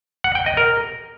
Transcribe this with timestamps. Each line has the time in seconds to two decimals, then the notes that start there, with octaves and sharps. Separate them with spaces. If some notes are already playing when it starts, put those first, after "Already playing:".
0.24 F#5
0.35 G5
0.46 D#5
0.57 A#4